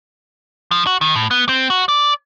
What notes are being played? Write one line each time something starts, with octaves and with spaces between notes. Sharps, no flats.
F3
F#4
D#3
A2
B3
C4
F#4
D5